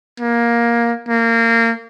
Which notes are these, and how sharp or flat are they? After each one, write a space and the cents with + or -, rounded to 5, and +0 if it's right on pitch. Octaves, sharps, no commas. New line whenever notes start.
A#3 +15
A#3 -25